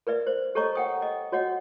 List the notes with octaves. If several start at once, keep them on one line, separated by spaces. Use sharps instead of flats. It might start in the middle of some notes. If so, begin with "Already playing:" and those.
A#4 B4 D5 E5
C5
G4 A4 C#5 D#5 A#5 C#6
F#5 G5 D#6
D#5
F#4 C#5 D#5 F#5